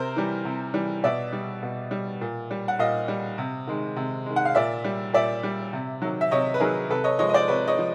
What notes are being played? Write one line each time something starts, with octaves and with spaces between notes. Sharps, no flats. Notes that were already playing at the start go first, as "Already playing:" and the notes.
Already playing: C3 A#4 C5
E3 G3
C3
E3 G3
B2 D5 E5
G3
B2
G3
A#2
G3
F#5
A#2 D#5 F5
G3
C3
D#3 G#3
C3
D#3 G#3
F#5
F5
A#2 D5 E5
G3
A#2 D5 E5
G3
C3
D#3 F#3
E5
C3 C#5 D#5
B4
D#3 F#3 G#4 A#4
C3 A4 B4
C#5 D#5
F3 G#3 C#5 D#5
D#5
C5 D5
C3 B4 C#5
C#5 D#5
F3